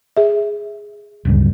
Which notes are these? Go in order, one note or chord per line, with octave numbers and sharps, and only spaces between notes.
G#4 E5
D1 C#2 G2